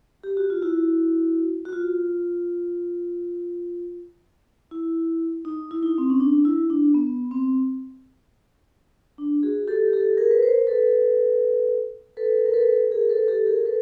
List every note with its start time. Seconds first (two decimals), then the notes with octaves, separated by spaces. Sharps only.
0.24 G4
0.37 F#4
0.50 F4
0.62 E4 F#4
1.65 F#4
1.73 F4
4.71 E4
5.45 D#4
5.71 E4
5.83 D#4
5.98 C4
6.10 C#4
6.20 D4
6.45 E4
6.70 D4
6.94 B3
7.31 C4
9.18 D4
9.43 F#4 G#4
9.68 G4 A4
9.93 G4 A4
10.17 G#4 A#4
10.31 B4
10.42 A#4 C5
10.67 A4 B4
12.17 A4 B4
12.46 A#4
12.53 A4 B4
12.91 G#4 A#4
13.09 A4 B4
13.28 G4 A4
13.47 G#4 A#4
13.65 A4 B4